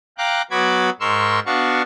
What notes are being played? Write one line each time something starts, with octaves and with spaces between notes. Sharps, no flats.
F5 G5 A#5 D6 F#6
F#3 B3 F#4 B5 D6 G#6
G#2 A#4 C6 C#6 E6
B3 D4 F#4 F5 C#6